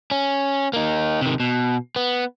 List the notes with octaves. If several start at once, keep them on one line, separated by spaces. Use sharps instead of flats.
C#4
A#3 D#4
C3 D#3
B2
B3